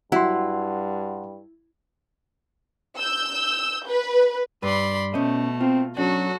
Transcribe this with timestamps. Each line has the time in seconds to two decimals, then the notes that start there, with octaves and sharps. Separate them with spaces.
0.12 G2 F#3 E4 F#5 C6
2.97 E6 G6
3.87 B4
4.62 G2 B4 D5 B5 C6
5.14 B2 A3 C#4 C5 D#5
5.60 C4 F4
5.97 F#3 C#4 D4 F#4 A4